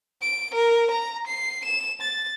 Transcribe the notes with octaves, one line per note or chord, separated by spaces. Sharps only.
D7
A#4
A#5
C7
E7
A6